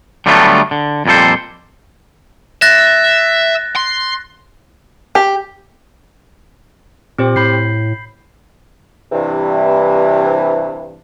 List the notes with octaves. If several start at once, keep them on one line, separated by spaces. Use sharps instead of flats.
D3 F#3 G3 A3 B3 F4
D3
F2 A#2 G3 A4 C5
E5 F#6 A6 A#6
C6
G4
A#2 C4 G4 C5
A2 B5 G6 C7
G2 C3 E3